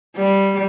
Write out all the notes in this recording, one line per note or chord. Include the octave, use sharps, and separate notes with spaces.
G3